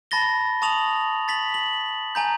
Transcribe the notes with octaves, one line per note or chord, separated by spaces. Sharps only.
A5 B5 A6 A#6 G7
A5 C#6 D#6 F7 F#7
A6 B6 F#7
F#7
G#5 A#5 G6